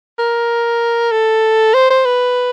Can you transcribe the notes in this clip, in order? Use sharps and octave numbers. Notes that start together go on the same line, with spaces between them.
A#4
A4
C5
C5
B4